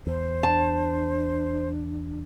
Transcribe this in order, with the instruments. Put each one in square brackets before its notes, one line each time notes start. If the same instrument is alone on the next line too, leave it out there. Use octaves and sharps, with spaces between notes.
[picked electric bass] E2 [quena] C5
[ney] D4 [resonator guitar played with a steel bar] A5